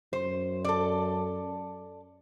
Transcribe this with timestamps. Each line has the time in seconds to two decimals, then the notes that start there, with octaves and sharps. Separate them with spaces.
0.13 F#2 C5
0.65 A4 D5